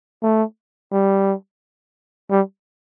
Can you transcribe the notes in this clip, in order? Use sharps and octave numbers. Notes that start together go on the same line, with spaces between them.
A3
G3
G3